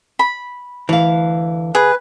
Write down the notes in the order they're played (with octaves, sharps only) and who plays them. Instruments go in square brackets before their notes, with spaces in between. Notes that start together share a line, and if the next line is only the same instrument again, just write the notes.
[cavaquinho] B5
[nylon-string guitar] D2 F5 [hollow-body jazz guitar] E3
[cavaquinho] G#4 [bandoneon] B4